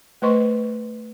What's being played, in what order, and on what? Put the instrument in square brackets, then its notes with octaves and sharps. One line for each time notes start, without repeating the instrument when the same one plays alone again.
[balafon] A3 B4 C5 D#5 C6 C#6